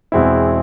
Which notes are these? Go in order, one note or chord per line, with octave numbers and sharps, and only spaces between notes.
E2 B2 G#3 C4 E4